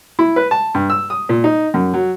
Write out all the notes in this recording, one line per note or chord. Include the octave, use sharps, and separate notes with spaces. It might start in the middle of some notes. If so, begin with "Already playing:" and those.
E4
B4
A5
G2
E6
D#6
A#2
D#4
F#2
F#3